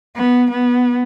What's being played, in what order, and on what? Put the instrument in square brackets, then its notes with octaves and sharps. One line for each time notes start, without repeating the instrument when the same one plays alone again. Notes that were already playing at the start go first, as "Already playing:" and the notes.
[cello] B3
B3